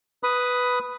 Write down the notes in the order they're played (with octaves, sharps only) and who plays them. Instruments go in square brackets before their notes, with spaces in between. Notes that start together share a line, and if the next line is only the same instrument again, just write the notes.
[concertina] B4 B5 D#6